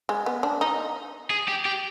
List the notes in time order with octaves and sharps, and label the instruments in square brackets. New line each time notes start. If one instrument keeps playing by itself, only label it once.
[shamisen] G#3
B3
D4
D#4
[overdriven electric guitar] G#4
G4
G4